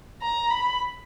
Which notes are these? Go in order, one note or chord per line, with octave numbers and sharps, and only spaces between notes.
A#5
B5